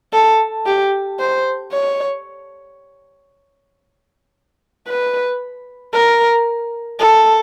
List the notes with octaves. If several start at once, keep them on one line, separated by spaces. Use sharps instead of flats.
A4
G4
C5
C#5
B4
A#4
A4